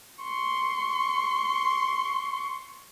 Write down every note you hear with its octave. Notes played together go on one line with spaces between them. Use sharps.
C6 C#6